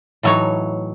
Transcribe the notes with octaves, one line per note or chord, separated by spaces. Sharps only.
A2 E3 F#3 D#4 C#5